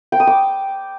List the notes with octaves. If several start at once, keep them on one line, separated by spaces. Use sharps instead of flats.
G5
D#6
D6